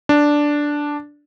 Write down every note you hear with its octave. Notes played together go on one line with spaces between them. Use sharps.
D4